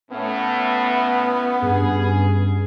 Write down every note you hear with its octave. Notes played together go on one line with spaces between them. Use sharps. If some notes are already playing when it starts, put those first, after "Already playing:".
A2 A3 B3 C#4
G2 G#4